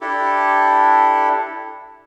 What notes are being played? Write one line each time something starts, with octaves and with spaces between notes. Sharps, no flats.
D4 E4 G4 A4